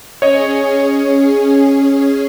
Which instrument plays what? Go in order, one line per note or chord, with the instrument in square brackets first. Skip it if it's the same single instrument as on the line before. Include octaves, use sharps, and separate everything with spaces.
[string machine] C#4 G#4 [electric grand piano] C#5 D#5